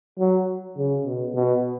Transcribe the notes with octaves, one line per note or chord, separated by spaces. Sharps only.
F#3
C#3
B2
B2